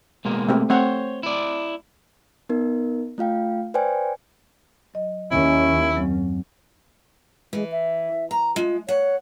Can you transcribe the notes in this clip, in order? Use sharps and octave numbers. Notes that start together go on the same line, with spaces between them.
B2 G#3 A#3
A3 C4 G4
A3 C4 C5 C#5 F#5
E4 D5
B3 D#4 A#4
A3 F4 F5 G5
B4 C5 D5 G5 G#5
F#3 D#5
D#2 C#4 E4
F#2 F#3 C4
E3 G#3
E5
A#5
G#3 F4
C#5 F#5